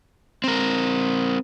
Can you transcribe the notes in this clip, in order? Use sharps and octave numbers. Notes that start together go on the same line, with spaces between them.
C4 A#4